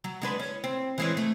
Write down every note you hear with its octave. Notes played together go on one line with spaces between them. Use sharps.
F#3
G#3 D4 B4
C#4
C4
E3 G#3 C#4
A3